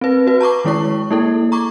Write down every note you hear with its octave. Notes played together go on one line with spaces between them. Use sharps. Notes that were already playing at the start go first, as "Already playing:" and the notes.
C4 B4
F#4 B4
A5 A#5 C#6 D6
D#3 G#3 E4 C#5 C#6
A#3 E4 A4
A#5 C#6 D6